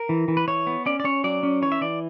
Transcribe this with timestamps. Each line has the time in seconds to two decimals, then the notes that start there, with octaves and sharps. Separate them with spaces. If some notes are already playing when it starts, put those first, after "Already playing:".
Already playing: A#4
0.09 E3
0.28 E3
0.37 B4
0.48 E3 C#5
0.67 B3
0.86 C#4 D5
1.00 D5
1.04 C#4 C#5
1.24 F#3 D5
1.43 C#4
1.62 E3 C#5
1.72 E5
1.81 E3 D5